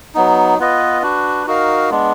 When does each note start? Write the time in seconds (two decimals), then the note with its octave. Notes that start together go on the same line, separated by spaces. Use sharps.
0.15 F#3 B3 D#4
0.59 B3 F4 B4 D#5
1.02 D4 F#4 B4
1.47 D#4 F#4 A#4 F5
1.90 G#3 B3 D4